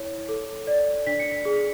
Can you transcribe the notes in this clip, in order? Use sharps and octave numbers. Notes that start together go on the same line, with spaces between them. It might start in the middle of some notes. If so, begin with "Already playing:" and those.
Already playing: E4 C#5
A4
D5
D4 B6
C#7
B6
G#4